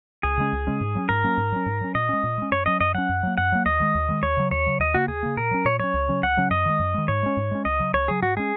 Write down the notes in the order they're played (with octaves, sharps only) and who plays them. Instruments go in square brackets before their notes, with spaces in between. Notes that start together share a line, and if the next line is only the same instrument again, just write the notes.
[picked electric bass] C#2 [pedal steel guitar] G#4
[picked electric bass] C#3 G#3 C#4
C#2
C#3 G#3 C#4
G#2
F#3 A#3 C#4
[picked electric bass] G#2 [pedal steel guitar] A#4
[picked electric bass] F#3 A#3 C#4
G#2
F#3 C#4
G#2
F#3 C#4
[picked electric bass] A#2 [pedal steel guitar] D#5
[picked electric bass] G#3 C#4
A#2
G#3 C#4
[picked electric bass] F#2 [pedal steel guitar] C#5
[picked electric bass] F#3 C#4 [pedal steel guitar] D#5
[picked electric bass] F#2 [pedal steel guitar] D#5
[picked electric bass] F#3 C#4 [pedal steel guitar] F#5
[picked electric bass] F#2
F#3 A#3
[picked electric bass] F#2 [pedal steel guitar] F#5
[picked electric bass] F#3 A#3
[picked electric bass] D#2 [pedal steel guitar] D#5
[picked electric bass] D#3 G#3
D#2
D#3 G#3
[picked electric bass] D#2 [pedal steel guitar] C#5
[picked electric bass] C#3 F#3
[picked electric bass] D#2 [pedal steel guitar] C#5
[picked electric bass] C#3 F#3
[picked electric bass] D#2 [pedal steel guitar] D#5
[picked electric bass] C#3 A#3 [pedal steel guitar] F#4
[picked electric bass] D#2 [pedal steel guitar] G#4
[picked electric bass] C#3 A#3
[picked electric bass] A#2 [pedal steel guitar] A#4
[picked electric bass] F#3 C#4
[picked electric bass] A#2 [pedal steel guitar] C#5
[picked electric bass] F#3 C#4 [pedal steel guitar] C#5
[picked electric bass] C#2
C#3 F#3 C#4
[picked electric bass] C#2 [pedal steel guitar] F#5
[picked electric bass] C#3 F#3 C#4
[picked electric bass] F#2 [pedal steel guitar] D#5
[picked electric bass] D#3 G#3
F#2
D#3 G#3
[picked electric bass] G#2 [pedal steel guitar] C#5
[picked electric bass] G#3 C#4
G#2
G#3 C#4
[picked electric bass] C#2 [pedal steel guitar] D#5
[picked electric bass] C#3 F#3
[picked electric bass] C#2 [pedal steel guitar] C#5
[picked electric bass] C#3 F#3 [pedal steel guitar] G#4
[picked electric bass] G#2 [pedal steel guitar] F#4
[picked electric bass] G#3 C#4 [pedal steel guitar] G#4